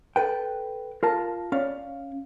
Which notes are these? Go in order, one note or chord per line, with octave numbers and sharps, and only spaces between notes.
A4 B4 G5
F4 A#4 A5
C#4 D5 F5